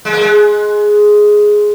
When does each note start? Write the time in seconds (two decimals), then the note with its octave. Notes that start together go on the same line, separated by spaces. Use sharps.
0.05 G#3
0.13 A#3
0.21 G#3